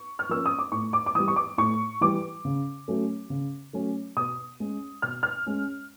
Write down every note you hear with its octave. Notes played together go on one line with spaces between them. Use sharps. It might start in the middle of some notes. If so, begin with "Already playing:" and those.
Already playing: C#6
F6
F3 A#3 C#4 E6
D#6
D6
A2 C#6
D6
D6
E3 G3 D#6
C#6
D6
A2 C#6
E3 G3 D6
C#3
F#3 A3 C#4
C#3
F#3 A3 C#4
B2 D#6
G#3 C#4
B2 F6
F6
G#3 C#4